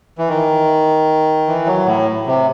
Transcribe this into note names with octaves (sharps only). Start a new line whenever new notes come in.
E3
D#3
E3
F#3
A2
C3